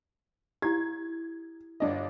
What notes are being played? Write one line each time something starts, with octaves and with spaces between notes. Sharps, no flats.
E4 G4 G#6
G1 D4 D#5